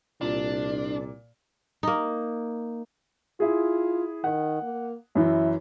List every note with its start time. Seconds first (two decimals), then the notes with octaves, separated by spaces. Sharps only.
0.21 C2 A#2 D4 D5
1.83 A#3 D#4
3.40 E4 F4 G#4
4.24 D#3 F#5
4.62 A#3
5.15 F#2 E3 E4